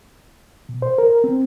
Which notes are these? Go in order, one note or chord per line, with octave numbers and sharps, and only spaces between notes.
B2
C5
A#4
C4